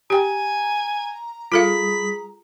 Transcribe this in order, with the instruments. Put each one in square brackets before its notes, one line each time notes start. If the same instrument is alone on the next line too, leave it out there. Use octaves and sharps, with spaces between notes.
[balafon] G4 G5 [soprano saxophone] G#5 [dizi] A#5
[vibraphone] G3 G#4 D#6 [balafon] F4 A4 F5 [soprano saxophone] B5